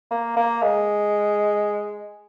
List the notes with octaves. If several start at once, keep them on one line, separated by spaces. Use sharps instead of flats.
A#3
A#3
G#3